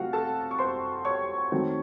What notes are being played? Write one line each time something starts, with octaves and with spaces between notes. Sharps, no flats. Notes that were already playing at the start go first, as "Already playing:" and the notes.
Already playing: C3 F#3 A3 C4 F4 F#4 F5 F#5
A4 A5
C#6
C5 C6
C#5 C#6
D#3 F#3 A3 C4